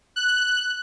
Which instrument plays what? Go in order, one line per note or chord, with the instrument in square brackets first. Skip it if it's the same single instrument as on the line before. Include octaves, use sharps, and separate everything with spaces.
[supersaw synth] F#6